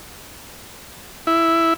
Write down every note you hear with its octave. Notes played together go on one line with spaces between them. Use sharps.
E4